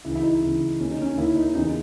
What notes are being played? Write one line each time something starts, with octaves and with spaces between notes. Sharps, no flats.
C#2 C#3 E3 E4
E4
D#4
C#2 C#3 E3
D#2 D#3 C#4
D#4
C#4
D#2 D#3 E4
D#4
E2 C#3 E3 D#4